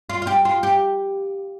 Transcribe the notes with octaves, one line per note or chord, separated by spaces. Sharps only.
F4
F4
G4
F4
G4